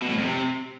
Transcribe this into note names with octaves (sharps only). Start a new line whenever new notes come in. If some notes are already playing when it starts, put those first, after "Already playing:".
B2
A2
F2
C3